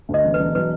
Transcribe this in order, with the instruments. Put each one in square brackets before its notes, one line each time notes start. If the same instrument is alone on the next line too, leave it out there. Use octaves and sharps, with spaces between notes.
[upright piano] D2
[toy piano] D#5
[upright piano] E1
[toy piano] B4
[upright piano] E1
[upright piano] F#3 [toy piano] B4